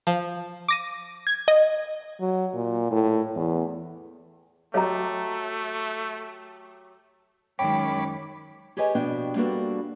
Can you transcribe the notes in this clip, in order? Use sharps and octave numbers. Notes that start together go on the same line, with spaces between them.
F3
D6 A#6 D#7
G#6
D#5
F#3
A#2
A2
E2
F#3 A3 G4 C#5 D#5 A#5
F#2 D#3 G#3 C#5 G5 B5 D6
G4 G#4 B4 C#5 D#5 G#5
F2 B2 D4 G4 G5
G3 A#3 B3 D4 F#4 A4